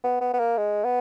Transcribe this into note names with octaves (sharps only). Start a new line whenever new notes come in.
B3
B3
B3
A#3
G#3
B3